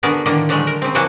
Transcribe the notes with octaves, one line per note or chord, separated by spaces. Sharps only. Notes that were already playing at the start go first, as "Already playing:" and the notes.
D3 B3 F#4 G#4 A#4
A2 D3 D#3 A#3
D3 F#3 G#3 A3
A#4
C#3 C4
E3 F#3 A#3 D#4 F#4 A5